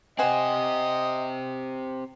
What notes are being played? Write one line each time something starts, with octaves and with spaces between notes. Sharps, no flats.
C4 G4 C5 D#5 F#5 G#5